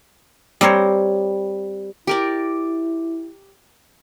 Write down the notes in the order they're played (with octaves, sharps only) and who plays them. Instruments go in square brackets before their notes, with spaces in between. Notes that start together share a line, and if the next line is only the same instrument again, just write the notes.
[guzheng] G3 C4 A#4 C5 C#5
[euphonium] E4 [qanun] G4 A#4 D5